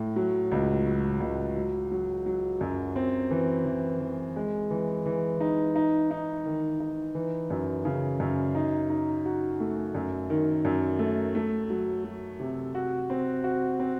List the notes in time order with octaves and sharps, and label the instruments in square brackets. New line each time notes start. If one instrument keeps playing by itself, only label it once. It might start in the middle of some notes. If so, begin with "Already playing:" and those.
Already playing: [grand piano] A2
F#3
C#2
F#3
C#2
F#3
F#3
F#3
F#2
C4
E3
E3
E3
G#3
E3
E3
D#4
D#4
D#4
D#3
D#4
E3
F#2
C#3
F#2
D#4
D#4
F#4
A3
F#2
D#3
F#2
A3
A3
F#3
F#3
C3
F#4
C4
F#4
C4